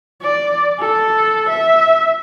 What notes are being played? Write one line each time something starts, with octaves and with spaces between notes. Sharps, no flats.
D5
A4
E5